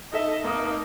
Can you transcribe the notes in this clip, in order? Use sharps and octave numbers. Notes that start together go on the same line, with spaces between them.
D#4 A4 D#5 E5
F1 A#3 D#4 D#6